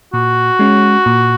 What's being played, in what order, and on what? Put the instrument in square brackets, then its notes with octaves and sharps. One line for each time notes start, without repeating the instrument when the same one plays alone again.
[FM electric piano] A#2 [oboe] F#4
[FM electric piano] G#3 C#4
A#2